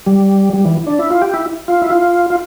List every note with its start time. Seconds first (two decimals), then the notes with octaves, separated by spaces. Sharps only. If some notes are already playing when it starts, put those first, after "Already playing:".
0.06 G3
0.53 G3
0.65 E3
0.87 D4
0.99 E4
1.10 F4
1.22 G4
1.34 E4
1.68 F4
1.82 E4
1.90 F4
2.30 F4